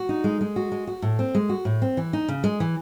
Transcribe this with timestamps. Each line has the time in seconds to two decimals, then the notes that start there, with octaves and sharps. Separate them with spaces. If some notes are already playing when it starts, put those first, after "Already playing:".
Already playing: F#4
0.09 D#4
0.24 G#3
0.41 G#3
0.56 F#4
0.72 G#3
0.87 F#4
1.02 A2
1.19 C4
1.35 G#3
1.49 F#4
1.65 A2
1.82 C4
1.97 E3
2.13 D#4
2.28 C#3
2.44 G#3
2.60 E3